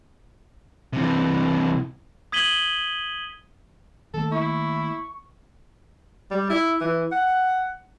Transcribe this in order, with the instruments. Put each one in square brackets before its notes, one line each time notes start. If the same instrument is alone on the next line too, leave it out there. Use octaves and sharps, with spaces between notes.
[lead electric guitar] C3 E3
[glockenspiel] D#6 G#6 B6 D#7 F#7 G7
[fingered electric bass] D#3 A3 A#3 [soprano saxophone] A4
[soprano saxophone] E4 [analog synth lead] C#6
[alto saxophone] G3
E4
E3
F#5